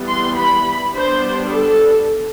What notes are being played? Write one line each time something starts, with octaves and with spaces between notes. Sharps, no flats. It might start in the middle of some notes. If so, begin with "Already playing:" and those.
Already playing: E3 G3 B3
C6
B5
G3 B3 D4 C5
A4